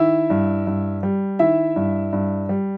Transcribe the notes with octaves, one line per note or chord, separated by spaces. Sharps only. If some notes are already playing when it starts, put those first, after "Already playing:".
Already playing: D#3 E4 E5
G2
G2
G3
D#3 E4 E5
G2
G2
G3